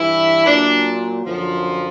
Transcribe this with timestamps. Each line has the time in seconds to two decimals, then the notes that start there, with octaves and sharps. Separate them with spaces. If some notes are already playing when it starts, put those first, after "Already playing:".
Already playing: G2 E3 E4
0.46 A#2 F#3 D4
1.25 F#2 D3 F3